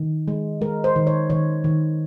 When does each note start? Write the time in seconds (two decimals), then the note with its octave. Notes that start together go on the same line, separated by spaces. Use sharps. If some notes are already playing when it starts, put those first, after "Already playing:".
Already playing: D#3
0.28 G#3
0.62 G#3 A#4
0.84 C5
0.96 D#3
1.07 C#5
1.30 D#3 C#5
1.64 D#3